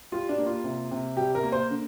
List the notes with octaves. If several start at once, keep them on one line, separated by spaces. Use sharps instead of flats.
G3 F4
D4
A#3
F4
C3
C3
G3 G4
A#4
A#3
C5
D3